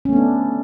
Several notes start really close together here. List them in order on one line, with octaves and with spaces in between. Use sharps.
C#4 A3 B3 D4